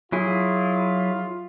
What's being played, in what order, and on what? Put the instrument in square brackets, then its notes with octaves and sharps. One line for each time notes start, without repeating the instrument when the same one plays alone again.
[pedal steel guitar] F#3 E4 G#4 [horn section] F4